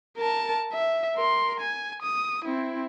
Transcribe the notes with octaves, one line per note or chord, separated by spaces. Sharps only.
A#4 A5
E5
A#4 C6
G#5
D#6
C4 E4